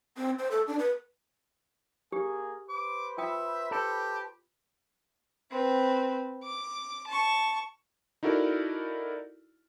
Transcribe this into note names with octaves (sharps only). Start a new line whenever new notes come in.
C4
C5
A4
D4
B4
A#3 G4 G#4
B4 C5 D6
F4 E5 G5 D#6
G4 A4
C4 B4
D6
A5 C#6
D#4 E4 F#4 A4 A#4 D5